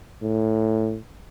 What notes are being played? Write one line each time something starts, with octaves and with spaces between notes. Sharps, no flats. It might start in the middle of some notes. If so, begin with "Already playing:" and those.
A2